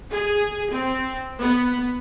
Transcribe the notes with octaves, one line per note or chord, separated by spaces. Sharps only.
G#4
C4
B3